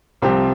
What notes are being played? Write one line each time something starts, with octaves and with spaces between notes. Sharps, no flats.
C2 C3 F3 C4 G4